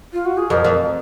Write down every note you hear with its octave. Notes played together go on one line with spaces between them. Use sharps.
F4
F#4
G#4
F2 A#4
F2